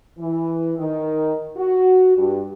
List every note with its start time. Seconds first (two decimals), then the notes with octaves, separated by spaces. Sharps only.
0.18 E3
0.78 D#3
1.57 F#4
2.18 G2